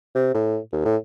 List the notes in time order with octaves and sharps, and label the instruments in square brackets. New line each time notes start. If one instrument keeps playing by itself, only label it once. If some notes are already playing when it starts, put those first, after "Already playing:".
[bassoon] C3
A2
D#2
A2